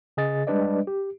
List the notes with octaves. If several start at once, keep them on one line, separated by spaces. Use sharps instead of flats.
C#3 G#4 D#5 A6
G3 G#3 D4 B4 D5 D#5
G4